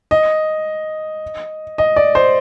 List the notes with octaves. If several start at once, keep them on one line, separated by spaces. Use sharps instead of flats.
D#5
D#5
D5
C5